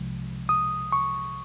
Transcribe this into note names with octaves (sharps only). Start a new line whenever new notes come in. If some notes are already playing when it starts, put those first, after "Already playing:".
Already playing: C2 C3 F3 G#3
D#6
C#6